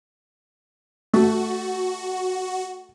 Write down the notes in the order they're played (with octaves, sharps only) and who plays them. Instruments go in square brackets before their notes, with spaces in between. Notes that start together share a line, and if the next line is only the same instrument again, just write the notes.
[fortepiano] A3 [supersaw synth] F#4